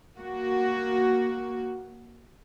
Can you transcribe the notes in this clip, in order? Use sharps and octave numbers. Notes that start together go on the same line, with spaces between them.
A#3 F#4